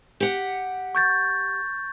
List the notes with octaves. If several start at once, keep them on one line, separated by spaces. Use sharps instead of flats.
G4 F#5
C#6 G6 A6